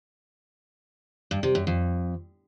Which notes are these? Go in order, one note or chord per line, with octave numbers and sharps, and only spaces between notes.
G2
C3
F#2
F2